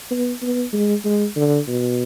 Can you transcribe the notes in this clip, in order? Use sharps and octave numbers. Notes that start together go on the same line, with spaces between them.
B3
B3
G#3
G#3
D3
B2